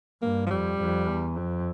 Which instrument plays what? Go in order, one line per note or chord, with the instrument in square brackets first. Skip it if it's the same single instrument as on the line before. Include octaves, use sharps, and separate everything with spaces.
[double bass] G2 [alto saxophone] A#3
[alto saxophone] F3
[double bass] F2 [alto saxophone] G3
[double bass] F2
E2
F2